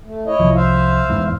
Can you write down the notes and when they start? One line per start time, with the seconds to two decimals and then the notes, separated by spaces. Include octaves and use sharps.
0.04 A3
0.26 E4 C#5 D#5
0.40 C2 F3
0.55 C5 E5 F5
1.10 E2 G#2 E3